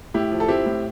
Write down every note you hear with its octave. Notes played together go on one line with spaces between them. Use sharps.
A2 E4 G4
F3
A4
C4 E4 G4
A2